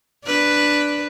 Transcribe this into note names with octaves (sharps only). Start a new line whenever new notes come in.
D4 B4